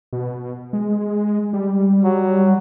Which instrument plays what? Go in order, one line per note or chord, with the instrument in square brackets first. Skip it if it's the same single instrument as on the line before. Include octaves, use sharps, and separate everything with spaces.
[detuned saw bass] B2
G#3
G3
[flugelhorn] F#3